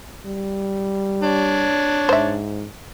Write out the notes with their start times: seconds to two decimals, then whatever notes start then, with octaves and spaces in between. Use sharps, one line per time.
0.26 G3
1.22 D4 C#5
2.09 G#2 C5 E5